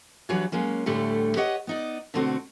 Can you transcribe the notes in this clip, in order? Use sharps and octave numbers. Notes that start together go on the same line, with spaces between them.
E3 F#3 G3 D4 F#4 C#5
F#3 G#3 A#3 C#4
D2 A2 D3 G3 A3 G4
G4 B4 C#5 D#5 F#5
B3 D#4 D5
B2 D3 A3 C4 F#4